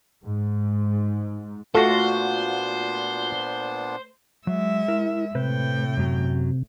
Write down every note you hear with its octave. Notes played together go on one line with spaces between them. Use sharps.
G#2
A#2 A3 B3 D4 F4 F#4 C5
F#3 G#3 E5
E4 A#4
A2 C3 B4 C5 G5
F#2 F#3